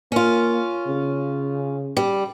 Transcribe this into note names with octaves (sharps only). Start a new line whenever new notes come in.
A#3 C#4 F4
C#3
G3